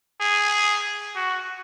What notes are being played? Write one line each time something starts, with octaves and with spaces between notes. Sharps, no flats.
G#4
F#4